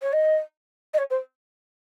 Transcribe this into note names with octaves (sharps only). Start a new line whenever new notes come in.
C#5
D#5
D#5
C#5
C5